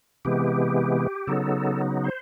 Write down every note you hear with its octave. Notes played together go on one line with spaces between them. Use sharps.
C3 E3 G#3 B3 G4
C#3 F#3 B3 D#4 A4
C5